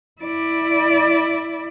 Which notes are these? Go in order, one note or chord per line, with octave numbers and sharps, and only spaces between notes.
E4 D5